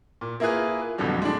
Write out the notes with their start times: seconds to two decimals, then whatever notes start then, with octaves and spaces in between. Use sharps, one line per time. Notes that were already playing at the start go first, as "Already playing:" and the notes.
0.21 A#2
0.40 A#3 E4 F4 G#4 B4
0.98 A1 F2 B2 D3 F#3 G3
1.22 G#3 D4